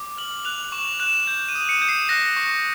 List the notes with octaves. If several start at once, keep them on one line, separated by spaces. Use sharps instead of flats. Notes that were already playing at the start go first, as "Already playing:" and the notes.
Already playing: D6
F6 F#7
F#6 F7
F7
C#6 E7
F#6 E7
G6
D#7
D#6
C#7
G6
C7
F#6 A#6
C#6